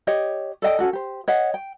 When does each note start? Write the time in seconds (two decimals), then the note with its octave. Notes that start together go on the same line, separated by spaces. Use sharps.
0.07 G4 C#5 D#5
0.62 A4 D5 D#5 G5
0.79 C#4 D4 F#4 A4
0.93 G4 C5
1.28 C#5 D#5 F#5
1.54 G5